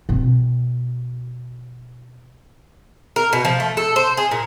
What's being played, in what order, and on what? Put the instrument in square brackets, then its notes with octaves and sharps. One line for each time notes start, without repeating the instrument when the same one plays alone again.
[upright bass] B2 C4
[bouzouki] A#4
B2
F3
A3
A4
C5
G#4
A#2